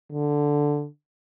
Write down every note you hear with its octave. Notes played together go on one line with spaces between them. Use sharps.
D3